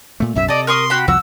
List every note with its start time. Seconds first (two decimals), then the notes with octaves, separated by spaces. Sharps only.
0.20 A#2 A3
0.35 B1 F#2 A2 E5
0.48 C3 A4 D5 D#5
0.67 A#4 C6 C#6 D#6
0.90 F#4 G4 B5
1.08 C2 F2 F3 F#4 E6